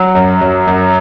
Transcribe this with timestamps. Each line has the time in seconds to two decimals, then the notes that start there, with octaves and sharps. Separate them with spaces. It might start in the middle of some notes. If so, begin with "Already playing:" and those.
Already playing: F#3
0.15 F#2
0.41 F#2
0.67 F#2